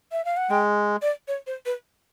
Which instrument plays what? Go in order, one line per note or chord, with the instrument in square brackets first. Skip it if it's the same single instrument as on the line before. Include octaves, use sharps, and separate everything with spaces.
[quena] E5
F5
F#5
[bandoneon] G#3 [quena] G5
[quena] D5
C#5
C5
B4